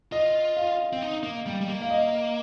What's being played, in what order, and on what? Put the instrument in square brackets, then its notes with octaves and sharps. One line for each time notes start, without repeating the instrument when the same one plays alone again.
[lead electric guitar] F4 [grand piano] D#5
[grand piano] F5
[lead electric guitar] C4
D#4
A#3
G3
G3
A#3
[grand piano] F5
D#5